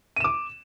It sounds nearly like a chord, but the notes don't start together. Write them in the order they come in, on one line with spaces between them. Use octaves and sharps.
D#7 E7 D6